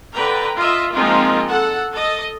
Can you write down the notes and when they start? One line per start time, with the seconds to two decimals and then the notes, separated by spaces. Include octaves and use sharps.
0.14 D3 B4 G5 A#5
0.56 F4 D#5 E5
0.94 F3 G#3 A#3 C4 D#4 F4
1.49 A4 F#5
1.93 A4 D#5